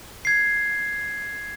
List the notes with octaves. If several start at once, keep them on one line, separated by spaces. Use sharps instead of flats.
G#6 C7